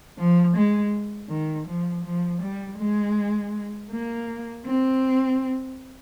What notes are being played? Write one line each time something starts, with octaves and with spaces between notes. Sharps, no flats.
F3
G#3
D#3
F3
F3
G3
G#3
A#3
C4